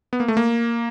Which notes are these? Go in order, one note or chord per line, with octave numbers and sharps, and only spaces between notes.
B3
A#3
A3
A#3